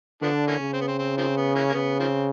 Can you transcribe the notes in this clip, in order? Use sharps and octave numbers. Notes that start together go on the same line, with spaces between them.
D3 F3 B3 D4
E3 A#3 C#4
C#3
C4
B3
C4
C4
D#3 F3 C4
B3
E3 A#3 C#4
A#3
C#3 B3
D#3 F3 C4